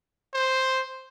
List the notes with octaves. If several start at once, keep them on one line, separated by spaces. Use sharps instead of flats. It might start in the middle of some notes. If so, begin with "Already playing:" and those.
C5